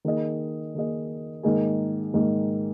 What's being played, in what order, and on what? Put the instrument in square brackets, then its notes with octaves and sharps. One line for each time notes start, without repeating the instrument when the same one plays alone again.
[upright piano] D#3 A#3 D#4 G#4 D#5
D#3 A#3 D#4 G#4 D#5
G#2 D#3 A#3 D#4 G#4
G#2 D#3 A#3 D#4 G#4